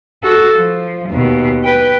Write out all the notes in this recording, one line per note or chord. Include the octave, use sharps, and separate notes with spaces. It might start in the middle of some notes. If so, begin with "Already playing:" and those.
F#4 A4
F3
D#2 B2
B4 G5